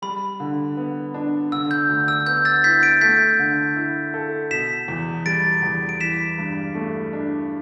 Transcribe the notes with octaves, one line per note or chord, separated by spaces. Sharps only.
G3 B5
D3
B3
D4
D3 E6
G6
D2
E6
B3 G6
E6 A6
E4 G6 B6
A6 D7
A3 G6 B6
D3
E4
A4
B2 B6 E7
E2
G3 A6 D7
E2
D7
E3 B6 E7
G2
A3
D4